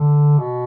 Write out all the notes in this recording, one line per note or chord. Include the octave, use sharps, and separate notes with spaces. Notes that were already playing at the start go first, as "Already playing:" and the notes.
Already playing: D3
B2